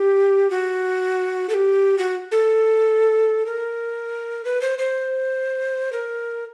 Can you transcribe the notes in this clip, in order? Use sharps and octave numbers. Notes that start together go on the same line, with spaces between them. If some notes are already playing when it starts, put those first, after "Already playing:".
Already playing: G4
F#4
A4
G4
F#4
A4
A#4
B4
C5
C5
A#4